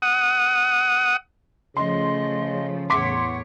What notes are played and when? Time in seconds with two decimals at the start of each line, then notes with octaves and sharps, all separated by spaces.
0.02 F#5 D#6
1.77 C#3 F3 A3 D#5 C6
2.90 E2 A2 C#5 F#5 C6 D6 B6